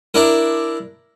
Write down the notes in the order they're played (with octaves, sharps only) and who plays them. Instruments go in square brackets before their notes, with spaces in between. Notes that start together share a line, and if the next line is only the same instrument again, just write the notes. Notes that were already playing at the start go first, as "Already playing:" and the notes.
[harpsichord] D4 E4 A#4